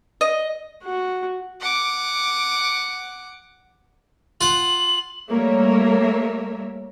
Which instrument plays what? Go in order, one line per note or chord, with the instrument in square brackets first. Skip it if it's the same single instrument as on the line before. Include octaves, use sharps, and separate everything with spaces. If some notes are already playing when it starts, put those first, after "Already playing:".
[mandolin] D#5
[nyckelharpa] F#4
[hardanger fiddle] F#5 D6
[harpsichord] F4 F#5 [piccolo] F#7
[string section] G3 A3 A#3 A#4 C#5 E5